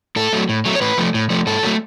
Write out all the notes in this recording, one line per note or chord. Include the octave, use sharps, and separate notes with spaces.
A2 A4
F#3 A3
A2
F#3 A3
C#5
A2 B4
F3 A3
A2
F3 A3
G#2 A4
F#3 A3